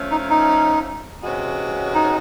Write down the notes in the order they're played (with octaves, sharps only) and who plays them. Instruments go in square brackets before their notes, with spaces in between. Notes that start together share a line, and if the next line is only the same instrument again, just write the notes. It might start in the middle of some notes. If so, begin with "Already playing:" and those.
Already playing: [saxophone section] F3 A3 C#4
[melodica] D#4
D#4
[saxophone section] C3 E3 G#3 C#4 F#4
[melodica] D#4